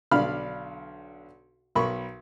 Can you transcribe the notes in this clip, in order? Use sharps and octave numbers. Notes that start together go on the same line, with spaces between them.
B1 D3 D5 F5 B5 F6
B1 A#4 B5 C#6